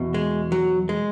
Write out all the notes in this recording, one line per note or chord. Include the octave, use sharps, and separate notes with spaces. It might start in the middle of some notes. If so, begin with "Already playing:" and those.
Already playing: E2 B2
G#3
F#3
G#3